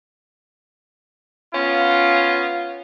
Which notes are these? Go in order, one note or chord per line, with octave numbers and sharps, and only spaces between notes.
B3 C#4 F4